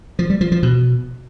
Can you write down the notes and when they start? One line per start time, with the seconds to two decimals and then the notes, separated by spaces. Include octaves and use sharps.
0.19 F3
0.30 G3
0.41 F3
0.52 F3
0.63 B2